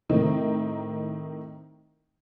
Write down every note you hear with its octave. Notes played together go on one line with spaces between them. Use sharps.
A2 D#3 C4 D#4